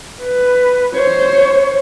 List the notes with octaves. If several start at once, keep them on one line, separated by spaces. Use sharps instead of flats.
B4
C5 C#5